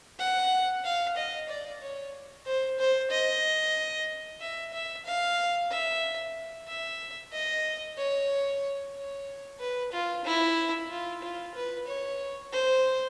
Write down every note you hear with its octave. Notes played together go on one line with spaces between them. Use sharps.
F#5
F5
D#5
D5
C#5
C5
C5
D#5
E5
E5
F5
E5
E5
D#5
C#5
C#5
B4
F4
E4
F4
F4
B4
C#5
C5